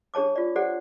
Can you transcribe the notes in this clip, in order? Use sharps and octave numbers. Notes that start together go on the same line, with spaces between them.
D4 G#4 C#5 A5 D6
F4 D5
G4 A4 C5 D5 F#5